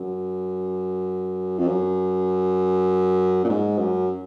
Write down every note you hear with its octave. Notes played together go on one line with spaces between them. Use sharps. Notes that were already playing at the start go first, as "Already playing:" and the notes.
Already playing: F#2
F2
F#2
A#2
G#2
F#2